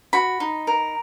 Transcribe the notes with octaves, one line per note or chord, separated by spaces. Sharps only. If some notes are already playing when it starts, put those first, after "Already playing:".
F#4 B5
D#4
A#4